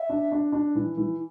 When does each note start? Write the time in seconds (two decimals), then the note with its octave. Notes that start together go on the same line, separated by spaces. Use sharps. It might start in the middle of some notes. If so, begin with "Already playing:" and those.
Already playing: E5
0.09 D4
0.32 D4
0.52 D4
0.75 E3
0.97 E3